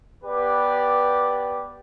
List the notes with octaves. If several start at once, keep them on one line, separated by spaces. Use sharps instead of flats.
B3 G4 B4 D5